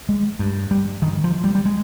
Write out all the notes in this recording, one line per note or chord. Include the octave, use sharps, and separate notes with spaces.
G#3
G2
G3
G2 D#3
F3
G3
G3
G#3